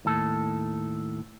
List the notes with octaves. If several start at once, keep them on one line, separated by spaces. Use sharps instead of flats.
D#2 A2 A4